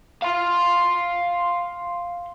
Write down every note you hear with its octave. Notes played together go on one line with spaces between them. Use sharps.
F5 C6